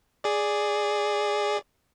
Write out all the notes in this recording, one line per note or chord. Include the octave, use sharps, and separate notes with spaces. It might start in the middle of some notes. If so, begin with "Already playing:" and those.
G#4 D5